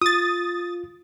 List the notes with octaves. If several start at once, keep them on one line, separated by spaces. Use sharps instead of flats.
F4 D#6 A6